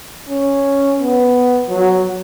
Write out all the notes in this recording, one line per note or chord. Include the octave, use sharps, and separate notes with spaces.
C#4
B3
F#3